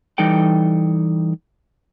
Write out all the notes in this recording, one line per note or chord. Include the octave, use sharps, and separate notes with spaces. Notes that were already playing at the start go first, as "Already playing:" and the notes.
E3 G3 D#4 A4 G5